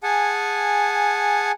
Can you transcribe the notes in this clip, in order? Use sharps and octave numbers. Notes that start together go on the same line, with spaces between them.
G#4 F#5 G#5 A5